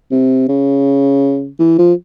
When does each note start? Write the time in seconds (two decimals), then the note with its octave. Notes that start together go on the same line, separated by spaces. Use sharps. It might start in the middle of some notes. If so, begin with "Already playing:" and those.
0.11 C3
0.49 C#3
1.60 E3
1.78 F3